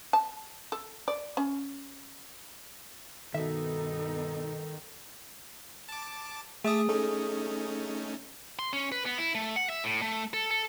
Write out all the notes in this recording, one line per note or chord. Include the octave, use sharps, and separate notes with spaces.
A5
A4
D5
C#4
G2 B2 D#3 B3 D#4 A4 E5
A5 D6
A3 G#4 E5 A5 D6 D#6
A3 C#4 D#4 A4
C6
C#4
B4
B3
E4
A3
F#5
E5
A2
A3
A4
A4